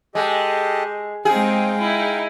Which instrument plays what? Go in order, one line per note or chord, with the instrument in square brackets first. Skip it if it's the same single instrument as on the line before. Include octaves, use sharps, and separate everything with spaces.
[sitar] G#3 [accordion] G4 A4 D#5
[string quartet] G#3 C4 D#4 [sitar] G#4 [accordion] F5 G5
[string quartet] D#4 E4